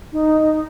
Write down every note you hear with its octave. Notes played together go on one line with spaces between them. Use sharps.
D#4